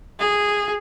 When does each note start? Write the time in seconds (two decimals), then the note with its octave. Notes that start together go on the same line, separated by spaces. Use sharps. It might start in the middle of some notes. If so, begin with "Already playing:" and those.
0.19 G#4